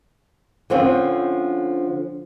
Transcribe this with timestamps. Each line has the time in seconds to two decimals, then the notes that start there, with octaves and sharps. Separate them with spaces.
0.70 D3 F3 C4 C#4